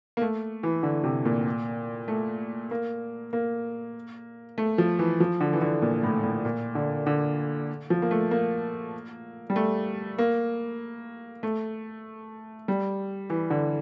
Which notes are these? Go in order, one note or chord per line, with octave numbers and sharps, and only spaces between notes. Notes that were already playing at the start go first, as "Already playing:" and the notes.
A#3
A3
E3
D3
C3
A#2
A3
A#3
A#3
A3
F3
E3
F3
D3
E3
D3
A#2
A2
A2
A#2
D3
D3
F3
A#3
A3
A#3
G3
A3
A#3
A3
G3
E3
D3